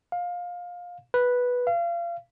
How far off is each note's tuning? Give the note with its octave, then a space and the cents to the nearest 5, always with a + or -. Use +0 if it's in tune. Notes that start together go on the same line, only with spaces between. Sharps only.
F5 +20
B4 -5
F5 -30